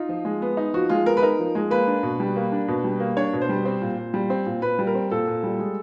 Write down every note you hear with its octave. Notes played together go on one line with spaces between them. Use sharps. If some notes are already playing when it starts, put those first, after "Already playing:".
Already playing: D#4 F4
F3
G#3
B3
D#4
F3 F#4
G#3 F4
B3 A#4
B4
D#4 A#4
F3
G#3
A#3 B4
D4
B2
G3
A#3
D4
B2
G3
A#3
D4 C#5
B2
C5
G3
C4
A#2
A#2
G3
C4
A#2
A#2 B4
G3
A#4
C4
A#2 A4
A#2
G3
G#3